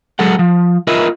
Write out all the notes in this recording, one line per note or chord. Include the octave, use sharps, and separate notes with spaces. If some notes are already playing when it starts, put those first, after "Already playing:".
F#3 G#3 A4 F#5
F3
F4 A#4 B4 D#5 E5